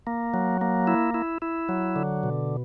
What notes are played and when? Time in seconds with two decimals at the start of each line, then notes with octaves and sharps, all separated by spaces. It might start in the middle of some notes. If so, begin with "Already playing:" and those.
0.07 A#3
0.34 F#3
0.61 A#3
0.87 E4
1.14 E4
1.42 E4
1.69 F#3
1.96 D3
2.23 B2